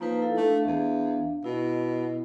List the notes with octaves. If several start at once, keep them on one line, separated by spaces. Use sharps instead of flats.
F3 A#3 D#4 B4
E4 A4 F5
A3 D4 E5 F5
E2
B2 E4 D#5